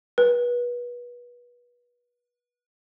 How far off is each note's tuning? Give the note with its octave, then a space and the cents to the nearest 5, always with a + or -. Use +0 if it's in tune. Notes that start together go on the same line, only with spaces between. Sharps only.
B4 -30